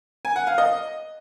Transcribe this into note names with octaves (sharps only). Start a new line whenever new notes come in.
G#5
F#5
F5
D#5